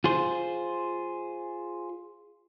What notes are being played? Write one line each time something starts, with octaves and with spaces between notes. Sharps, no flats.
F4 G#4 C5